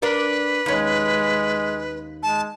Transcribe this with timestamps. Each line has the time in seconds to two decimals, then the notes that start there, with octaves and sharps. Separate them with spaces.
0.02 D4 A#4 B4 D5
0.66 D#2 G#3 C#4
2.23 G#3 A5